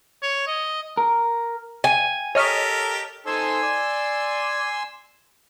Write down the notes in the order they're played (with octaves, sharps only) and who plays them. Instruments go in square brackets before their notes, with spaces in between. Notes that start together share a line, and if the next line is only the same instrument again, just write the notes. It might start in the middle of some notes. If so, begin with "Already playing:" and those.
[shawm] C#5
D#5
[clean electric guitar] A#4
[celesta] G5 D#7 [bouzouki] G#5
[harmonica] G4 A4 A#4 [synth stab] C#5 D#5 F6 [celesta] B6 D#7
[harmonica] D#4 A4 C5 [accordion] G#5 C6 E6
[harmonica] D5